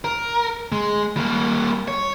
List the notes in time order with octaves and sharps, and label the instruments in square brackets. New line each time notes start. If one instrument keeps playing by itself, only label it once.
[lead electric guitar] A#4
G#3
G3 A#3
C#5